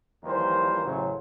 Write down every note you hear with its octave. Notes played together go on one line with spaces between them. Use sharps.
D#2 E3 F3 G3 A#4 C5
A1 F#2 A2 C#3 F#3 C5